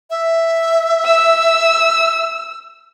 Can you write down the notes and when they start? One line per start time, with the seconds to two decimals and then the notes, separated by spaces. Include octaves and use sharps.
0.10 E5
1.06 E6